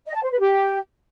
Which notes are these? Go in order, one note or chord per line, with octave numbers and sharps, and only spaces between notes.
D#5
A5
C5
B4
G4